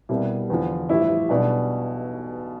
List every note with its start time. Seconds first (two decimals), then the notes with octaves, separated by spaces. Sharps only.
0.09 C2 B2 G3
0.50 E2 D3 F3
0.89 A1 G2 F3 E4
1.29 B1 B2 G3 D4